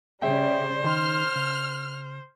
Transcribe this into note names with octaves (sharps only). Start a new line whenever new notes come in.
C#3 G3 G#4 C5 E5 G5
D#3 D#4 C6 F6
C#3